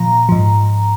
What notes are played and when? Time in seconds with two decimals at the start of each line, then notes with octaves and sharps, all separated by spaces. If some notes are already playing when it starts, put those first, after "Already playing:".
Already playing: A#2 F3 A#5
0.29 G#2 F3